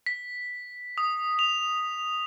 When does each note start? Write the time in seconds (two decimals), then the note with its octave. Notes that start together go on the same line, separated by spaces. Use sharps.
0.06 B6
0.98 D#6
1.39 F7